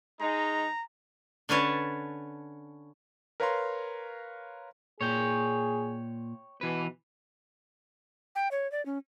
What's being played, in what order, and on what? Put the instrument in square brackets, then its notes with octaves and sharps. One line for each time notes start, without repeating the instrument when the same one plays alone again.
[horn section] G#3 D#4 [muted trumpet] A#5
[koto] D3 C#4 B4 C#5 A5
[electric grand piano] A#4 B4 C#5 F5 A#5 C6
[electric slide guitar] A#2 [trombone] G#4 [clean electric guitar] C#5 G5
[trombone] B2 [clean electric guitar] E3 B4
[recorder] G5
C#5
D5
C#4